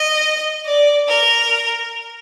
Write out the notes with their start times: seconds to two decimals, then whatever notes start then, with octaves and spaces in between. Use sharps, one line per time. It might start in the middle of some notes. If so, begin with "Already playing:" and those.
Already playing: D#5
0.65 D5
1.08 A#4